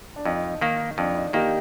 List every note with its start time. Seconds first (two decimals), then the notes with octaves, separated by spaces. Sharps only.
0.16 D4
0.25 F2 D#4
0.61 D#3 A#3
0.98 F2 D4
1.15 D#4
1.33 D#3 A#3 D#4 G4